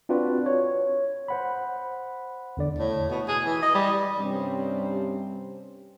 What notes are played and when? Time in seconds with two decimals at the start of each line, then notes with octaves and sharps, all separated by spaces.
0.09 C4 D4 F4 F#4 B4 D5
0.46 C#5
1.28 C5 F#5 B5
2.57 E2 D3 D5
2.78 A2
3.10 B2
3.28 G#4
3.45 E3
3.63 D#5
3.74 G3
4.19 G2 C3 G3 C4 C#4 G4